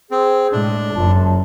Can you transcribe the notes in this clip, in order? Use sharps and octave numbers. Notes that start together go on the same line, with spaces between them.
C4 G#4
A2 G#3 D4
F#1 F#2 F4 A5